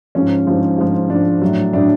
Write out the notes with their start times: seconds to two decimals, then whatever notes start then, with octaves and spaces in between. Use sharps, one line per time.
0.15 G#2 F3 C#4
0.47 G#2 F3
0.78 G#2 F3
1.10 G#2 F3 D4
1.42 A2 F#3
1.73 A2 F#3 D4